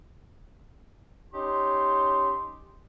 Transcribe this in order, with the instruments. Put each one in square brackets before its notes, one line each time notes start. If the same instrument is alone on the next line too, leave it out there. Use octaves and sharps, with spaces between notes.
[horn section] C#4 D#4 G4 C6